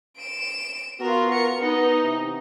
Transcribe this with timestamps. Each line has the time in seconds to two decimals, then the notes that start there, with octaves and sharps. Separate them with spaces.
0.17 D7 E7
1.00 B3 F4 F#4 A#4
1.31 A#4 C#7
1.61 B3 D#4
2.02 C3 E3